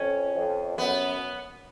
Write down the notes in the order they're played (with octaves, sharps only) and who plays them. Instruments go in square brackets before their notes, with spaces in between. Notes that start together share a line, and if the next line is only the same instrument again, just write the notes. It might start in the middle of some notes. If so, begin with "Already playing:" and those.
Already playing: [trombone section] F2 [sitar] C#4
[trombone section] F2
[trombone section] F#2 [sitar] B3